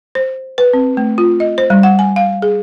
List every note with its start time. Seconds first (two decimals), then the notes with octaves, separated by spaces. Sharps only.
0.15 C5
0.58 B4
0.73 C4
0.97 A3
1.18 F4
1.40 D#5
1.58 C5
1.70 G3
1.83 F#5
1.99 G#5
2.16 F5
2.42 G#4